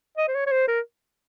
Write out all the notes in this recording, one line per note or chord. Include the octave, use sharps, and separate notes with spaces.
D#5
C5
C#5
C#5
C5
A#4